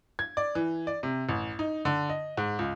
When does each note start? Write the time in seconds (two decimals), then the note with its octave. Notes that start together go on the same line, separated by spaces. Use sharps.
0.19 G#6
0.37 D5
0.55 E3
0.87 D5
1.03 C3
1.29 A1
1.59 D#4
1.85 D3
2.10 D#5
2.37 G#2
2.59 C#2